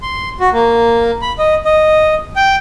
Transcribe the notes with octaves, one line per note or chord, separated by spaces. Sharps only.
C6
F#4
A#3
B5
D#5
D#5
G5